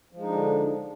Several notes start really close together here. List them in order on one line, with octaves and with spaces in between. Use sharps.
F3 G#3 D#4 D4 D3